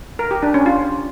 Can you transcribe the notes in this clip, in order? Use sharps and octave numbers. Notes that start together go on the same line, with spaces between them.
A#4
G4
D4
C#4
F4